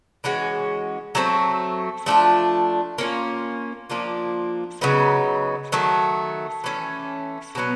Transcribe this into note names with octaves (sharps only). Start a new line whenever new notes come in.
E3 G#3 C#4 F#4
F#3 A3 C4
F3 A3 D4 F4
A#3 C#4 F4
F3 A#3 D4 F4
C#3 F#3 B3 D#4
D#3 F#3 A3
E3 A3 C#4
B2 F#3 B3